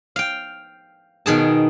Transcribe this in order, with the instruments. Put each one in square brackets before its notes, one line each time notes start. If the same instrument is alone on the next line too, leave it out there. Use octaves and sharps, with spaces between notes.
[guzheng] F5 G5
B2 D#3 G#4 A5